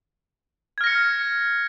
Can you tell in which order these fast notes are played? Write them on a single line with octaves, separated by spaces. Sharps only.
G#6 F6 A#6 C#7